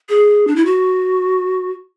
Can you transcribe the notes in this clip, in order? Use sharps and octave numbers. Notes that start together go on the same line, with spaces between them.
G#4
D4
E4
F#4